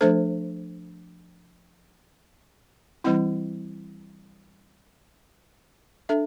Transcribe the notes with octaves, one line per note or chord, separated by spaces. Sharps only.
F3 A3 D4 A4 C5
E3 G3 C4 E4
D4 A4 E5